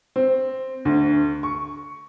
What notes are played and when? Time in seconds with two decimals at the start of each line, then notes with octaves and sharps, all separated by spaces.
0.16 C4
0.85 D2
1.43 C#6